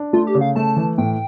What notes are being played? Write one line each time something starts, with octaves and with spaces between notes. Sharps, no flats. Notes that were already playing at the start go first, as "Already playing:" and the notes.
Already playing: D4
A3 F4
G4
C#3
F5
A3 A5
E3
A2 G5